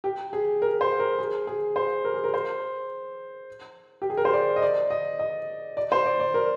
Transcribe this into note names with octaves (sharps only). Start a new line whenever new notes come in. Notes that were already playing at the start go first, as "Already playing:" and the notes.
G4
G#4
A#4
C5
A#4
G#4
G#4
C5
A#4
G#4
A#4
C5
G4
G#4
A#4
C5
D5
D#5
D5
D#5
D#5
D5
C5
D5
D5
A#4